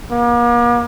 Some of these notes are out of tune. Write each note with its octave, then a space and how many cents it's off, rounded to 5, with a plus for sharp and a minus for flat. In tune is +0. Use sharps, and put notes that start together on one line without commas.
A#3 +40